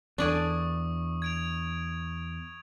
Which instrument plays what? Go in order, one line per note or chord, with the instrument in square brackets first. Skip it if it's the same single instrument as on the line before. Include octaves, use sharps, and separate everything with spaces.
[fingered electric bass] E2 [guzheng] D4 D5 G#5 [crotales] C#6 D#6
[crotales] G#6 D7 F7